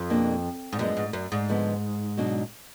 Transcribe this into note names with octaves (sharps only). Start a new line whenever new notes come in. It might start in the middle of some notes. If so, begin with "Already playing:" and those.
Already playing: F2
B2 A#3 D4 G#4
G#2
F#2 F3 G#3 B3 D4
G#2
F#2
G#2
D3 F3 G#3 B3
B2 F#3 D4 G#4